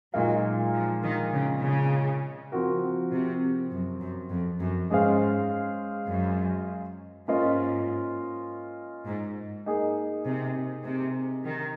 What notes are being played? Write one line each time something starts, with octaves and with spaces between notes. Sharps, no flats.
A#2 F#3 G#3 D#4 A#4 F5
F3
D#3
C#3
C#3
F3 C4 F#4 A#4
C3
F#2
F#2
F2
F#2
G#2 G#3 C#4 G#4 C5 F5
F#2
G#2 A#3 C#4 F4 C5 D#5
G#2
A#3 D#4 G#4
C3
C3
D#3